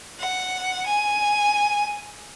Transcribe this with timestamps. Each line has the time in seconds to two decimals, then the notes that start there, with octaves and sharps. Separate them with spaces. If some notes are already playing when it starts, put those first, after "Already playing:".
0.19 F#5
0.87 G#5